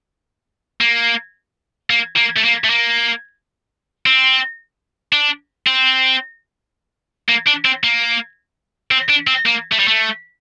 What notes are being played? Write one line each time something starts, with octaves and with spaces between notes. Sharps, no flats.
A#3
A#3
A#3
A3
A#3
A3
A#3
C4
D4
C4
A#3
D4
C4
A#3
C4
D4
C4
A#3
A3
G3
A3